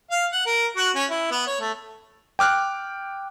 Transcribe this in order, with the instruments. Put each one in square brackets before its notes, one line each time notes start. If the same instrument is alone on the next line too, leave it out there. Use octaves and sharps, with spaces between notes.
[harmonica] F5
F#5
A#4
F#4
C#4
E4
B3
C#5
A3
[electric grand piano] G5 D6 F6 F#6